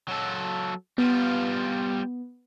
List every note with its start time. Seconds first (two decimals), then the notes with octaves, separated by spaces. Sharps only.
0.08 F#3 A4
0.98 G3 B3 F4